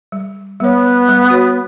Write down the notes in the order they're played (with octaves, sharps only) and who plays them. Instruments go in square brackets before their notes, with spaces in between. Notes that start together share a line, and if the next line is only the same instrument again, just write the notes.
[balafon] G3
[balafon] G3 C#5 [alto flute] B3
[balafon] G3
F#4 B4 C#5